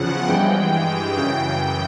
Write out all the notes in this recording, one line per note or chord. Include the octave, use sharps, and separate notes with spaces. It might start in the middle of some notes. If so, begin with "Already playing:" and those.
Already playing: E2 C#3 F3 F#5
G2 E3 G#3 G5
F#2 C#3 E3 G5